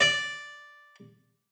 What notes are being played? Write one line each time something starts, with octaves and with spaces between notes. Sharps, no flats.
D5